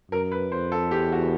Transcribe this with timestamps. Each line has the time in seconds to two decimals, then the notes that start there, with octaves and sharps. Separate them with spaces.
0.11 F#2 A#4
0.31 B4
0.52 F2 C5
0.72 A4
0.91 E2 G4
1.12 F#4